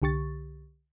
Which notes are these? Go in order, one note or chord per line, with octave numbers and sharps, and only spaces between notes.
C2 D3 G4 C#6 A6